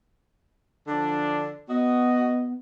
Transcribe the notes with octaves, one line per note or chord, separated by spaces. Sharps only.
D3 F3 D4
B3 F#4 D#5